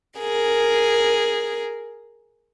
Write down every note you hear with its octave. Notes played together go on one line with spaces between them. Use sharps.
G#4 A#4